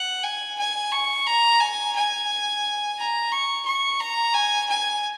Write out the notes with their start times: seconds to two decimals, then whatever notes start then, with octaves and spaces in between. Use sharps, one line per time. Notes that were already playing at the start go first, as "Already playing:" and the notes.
Already playing: F#5
0.23 G#5
0.58 G#5
0.92 C#6
1.27 A#5
1.60 G#5
1.95 G#5
2.98 A#5
3.32 C#6
3.66 C#6
4.00 A#5
4.34 G#5
4.69 G#5